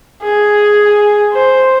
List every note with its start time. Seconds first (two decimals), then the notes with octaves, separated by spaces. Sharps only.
0.23 G#4
1.33 C5